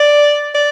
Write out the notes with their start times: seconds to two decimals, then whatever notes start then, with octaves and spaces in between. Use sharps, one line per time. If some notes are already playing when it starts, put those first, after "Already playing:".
Already playing: D5
0.54 D5